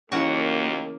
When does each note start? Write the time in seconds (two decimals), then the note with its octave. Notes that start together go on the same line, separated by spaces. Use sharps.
0.12 D#2 C#3 E3 A#3 F#4